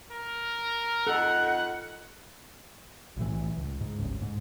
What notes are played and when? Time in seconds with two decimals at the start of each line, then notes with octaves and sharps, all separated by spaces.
0.12 A#4
1.07 F2 D#4 A4 F#5
3.17 B1 A2 E3
3.57 C#2
3.81 G#2
3.99 G1 C#2
4.22 G#2